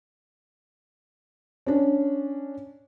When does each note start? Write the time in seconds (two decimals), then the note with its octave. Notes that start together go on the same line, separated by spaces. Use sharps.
1.66 C#4 D4